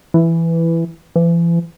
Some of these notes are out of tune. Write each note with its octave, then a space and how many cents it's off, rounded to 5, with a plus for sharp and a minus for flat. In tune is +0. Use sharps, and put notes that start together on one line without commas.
E3 +10
E3 +40